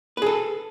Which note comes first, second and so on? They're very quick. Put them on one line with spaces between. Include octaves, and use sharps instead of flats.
B4 G#4 A4